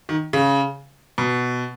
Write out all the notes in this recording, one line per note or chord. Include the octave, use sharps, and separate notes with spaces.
D#3
C#3
B2